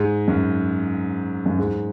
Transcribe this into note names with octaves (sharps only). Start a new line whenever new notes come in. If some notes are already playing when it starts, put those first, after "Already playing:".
Already playing: G#2
F#2
F#2
G#2